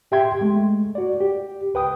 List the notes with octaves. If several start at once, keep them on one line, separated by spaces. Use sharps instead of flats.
A2 G4 E5 G5 C6 G#6
G#3 A3
F#4 D5
G4
C#2 B4 G5 D#6